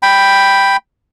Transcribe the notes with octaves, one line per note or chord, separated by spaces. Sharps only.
G5 B5